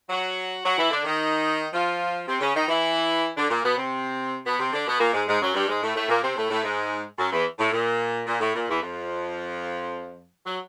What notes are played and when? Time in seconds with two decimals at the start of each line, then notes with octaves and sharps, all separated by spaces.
0.09 F#3 F#4
0.64 F#3 F#4
0.77 E3 E4
0.91 D3 D4
1.05 D#3 D#4
1.73 F3 F4
2.28 C3 C4
2.40 C#3 C#4
2.54 D#3 D#4
2.68 E3 E4
3.36 D3 D4
3.50 A#2 A#3
3.63 B2 B3
3.77 C3 C4
4.45 B2 B3
4.58 C3 C4
4.72 D3 D4
4.86 B2 B3
5.00 A#2 A#3
5.13 G#2 G#3
5.27 G#2 G#3
5.41 F#2 F#3
5.54 G2 G3
5.68 G#2 G#3
5.82 A2 A3
5.95 A2 A3
6.08 A#2 A#3
6.22 C3 C4
6.36 A2 A3
6.50 A2 A3
6.63 G#2 G#3
7.18 F#2 F#3
7.32 E2 E3
7.59 A2
7.72 A#2
8.27 A#2
8.41 A2
8.54 A#2
8.68 E2 E3
8.81 F2 F3
10.45 F#3